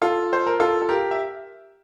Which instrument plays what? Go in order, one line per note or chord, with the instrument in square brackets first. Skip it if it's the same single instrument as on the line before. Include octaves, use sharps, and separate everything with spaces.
[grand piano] F4 A4
C5
A#4
F4 A4
A4
G4 A#4
E5